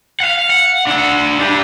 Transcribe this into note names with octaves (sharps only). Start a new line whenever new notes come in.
F5 F#5
F#5
D4 E5
D4 G4